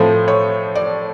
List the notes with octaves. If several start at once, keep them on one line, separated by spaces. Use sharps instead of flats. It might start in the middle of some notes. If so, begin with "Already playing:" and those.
Already playing: A2 F3 A3 C4 C5
C#5
D5